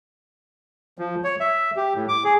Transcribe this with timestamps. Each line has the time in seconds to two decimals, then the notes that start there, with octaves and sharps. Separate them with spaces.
0.98 F3
1.24 C#5
1.40 E5
1.76 G4
1.95 A2
2.09 D6
2.24 G#4